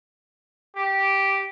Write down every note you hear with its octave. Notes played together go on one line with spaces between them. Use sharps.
G4